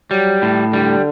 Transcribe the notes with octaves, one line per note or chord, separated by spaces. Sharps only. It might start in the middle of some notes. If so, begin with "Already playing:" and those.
F#3 G3
A2
D3 G3